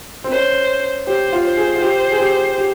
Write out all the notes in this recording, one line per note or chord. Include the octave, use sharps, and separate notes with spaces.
C4
C#4 C5
G4 C5
F4
C5
G#4
F4
G4
G#4
G4
G4